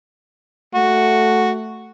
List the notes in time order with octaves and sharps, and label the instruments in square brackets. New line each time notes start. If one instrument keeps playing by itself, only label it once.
[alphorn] A3 [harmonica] F#4